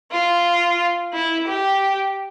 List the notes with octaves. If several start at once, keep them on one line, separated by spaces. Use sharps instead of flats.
F4
E4
G4